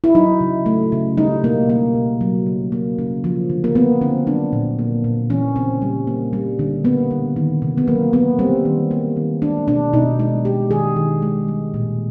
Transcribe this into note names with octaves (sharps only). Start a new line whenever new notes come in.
E4
F#3 D#4
C#3
A3
C#3
G3 D#4
B2 A#3
A#3
B2
F#3
C#3
A#3
C#3
F3
D3
A#3
A#3 B3
D3 C4
F#3 D4
A#2
A#3
A#2
E3 C#4
C#3 C4
G3
A#3
G3
D3
A#3 B3
D3
D#3
C3
B3
F#3 A#3
A#3 B3
G3 C4
D#3
A#3
D#3
G#3 D4
B2 D4
B2 D#4
G#3 D#4
G#3 G4
D#3 G#4
D#3
G#3
G3
A#2